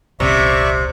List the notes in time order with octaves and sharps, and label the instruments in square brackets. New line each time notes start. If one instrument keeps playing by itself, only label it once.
[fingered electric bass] D#1 C2 C#4 [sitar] C3 [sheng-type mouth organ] D5 E5 C#6